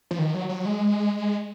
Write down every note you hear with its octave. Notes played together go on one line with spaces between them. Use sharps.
F3
D#3
F#3
F#3
G#3